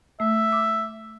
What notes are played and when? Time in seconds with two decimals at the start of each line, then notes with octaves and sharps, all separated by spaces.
0.20 A3 E5
0.52 D6